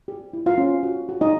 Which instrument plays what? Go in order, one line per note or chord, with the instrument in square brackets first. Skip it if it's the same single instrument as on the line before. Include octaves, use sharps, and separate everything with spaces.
[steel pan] G4
E4
F4 F5
C#4
F#4
F#4
D#4 D#5